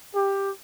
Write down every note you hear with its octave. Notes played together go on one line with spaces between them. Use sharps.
G4